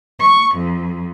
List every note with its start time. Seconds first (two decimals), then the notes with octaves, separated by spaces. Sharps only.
0.18 C#6
0.55 F2